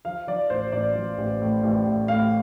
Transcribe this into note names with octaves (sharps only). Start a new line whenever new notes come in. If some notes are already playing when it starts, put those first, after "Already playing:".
F3 F5
F3 D5
A1 C5
A1 D5
F3
A1
A2
A1
A1
A2 F5